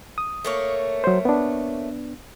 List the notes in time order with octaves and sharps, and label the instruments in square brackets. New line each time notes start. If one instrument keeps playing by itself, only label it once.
[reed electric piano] D#6
[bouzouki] A3 A#3 C#5
[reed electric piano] F#3 C5
B3 D4